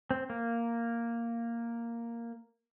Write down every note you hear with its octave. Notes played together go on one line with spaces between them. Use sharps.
C4
A#3